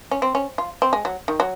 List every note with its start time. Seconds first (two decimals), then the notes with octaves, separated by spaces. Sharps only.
0.11 C#4
0.22 C4
0.35 C#4
0.58 F4
0.82 C4
0.93 G#3
1.05 F#3
1.28 D#3
1.40 F#3